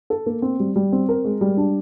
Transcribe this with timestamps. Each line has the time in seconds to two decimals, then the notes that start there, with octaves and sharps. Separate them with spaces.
0.10 A4
0.26 A#3
0.42 C4
0.60 G3
0.76 G3
0.92 C4
1.09 A#4
1.25 G#3
1.41 G3
1.57 D4